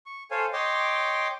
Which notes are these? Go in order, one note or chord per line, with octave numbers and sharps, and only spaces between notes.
C#6
A4 C5 C#5 F5 G#5
C#5 D#5 G5 C6 D6